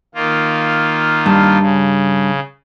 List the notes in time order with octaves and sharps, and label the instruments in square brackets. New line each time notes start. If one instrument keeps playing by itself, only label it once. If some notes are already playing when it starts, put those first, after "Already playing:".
[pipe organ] D#3 A#3 F4
[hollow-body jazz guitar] G2
[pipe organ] C#3